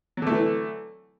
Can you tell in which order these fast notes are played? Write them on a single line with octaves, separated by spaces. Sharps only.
F#3 D3 A3 E3